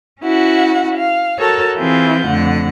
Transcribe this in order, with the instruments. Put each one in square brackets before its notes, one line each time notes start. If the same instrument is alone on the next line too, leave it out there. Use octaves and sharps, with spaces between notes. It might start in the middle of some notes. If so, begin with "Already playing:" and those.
[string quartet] C#4 E4 F#4 F#5
F5
F#4 A4 A#4 C#5 A5
E3 C4 E4 F4 G#4 G6
F2 D3 A3 F#5